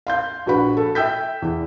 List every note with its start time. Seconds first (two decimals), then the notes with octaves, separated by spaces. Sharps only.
0.07 F5 C6 G6
0.46 A#1 F#4 B4 B5
0.77 A4
0.95 E5 G5 E6 G6 B6
1.42 E2